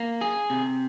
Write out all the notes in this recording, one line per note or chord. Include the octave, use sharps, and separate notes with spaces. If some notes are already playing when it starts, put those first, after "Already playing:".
Already playing: A#3
G#4
C3